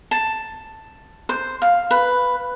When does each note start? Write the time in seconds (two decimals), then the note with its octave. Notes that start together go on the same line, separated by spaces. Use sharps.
0.11 A5
1.29 C5
1.62 F5
1.91 B4